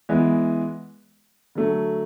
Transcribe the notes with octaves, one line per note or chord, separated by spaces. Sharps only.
E3 G#3 B3
D3 F#3 A3